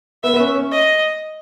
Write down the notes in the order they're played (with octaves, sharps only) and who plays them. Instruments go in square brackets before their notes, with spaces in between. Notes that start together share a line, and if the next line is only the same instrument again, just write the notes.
[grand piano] B3 [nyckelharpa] E5
[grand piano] B3
C#4
C#4
[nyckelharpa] D#5